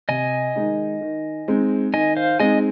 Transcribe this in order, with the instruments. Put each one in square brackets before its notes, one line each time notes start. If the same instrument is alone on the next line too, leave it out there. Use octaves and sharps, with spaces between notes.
[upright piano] C3 [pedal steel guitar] D#5 G#5
[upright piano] D#3 G#3 D#4
D#3
G#3 C4 D#4
[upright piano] D#3 [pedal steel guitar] D#5 G#5
[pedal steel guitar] C5 F5
[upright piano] G#3 C4 D#4 [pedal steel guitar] D#5 G#5